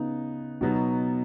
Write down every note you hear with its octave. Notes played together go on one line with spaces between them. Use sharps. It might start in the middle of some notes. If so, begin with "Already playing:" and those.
Already playing: C#3 B3 D#4
B2 F#3 B3 D#4 F#4